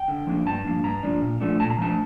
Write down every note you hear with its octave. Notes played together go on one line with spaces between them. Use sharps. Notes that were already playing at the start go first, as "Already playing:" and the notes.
Already playing: G5
D3
F3 A#3 D4
G2 A5
F3 A#3 D4
G2 A#5
F3 A#3 D4
A#2
F3 A3 D4
A#2 A5
A#5
F3 A3 D4 A5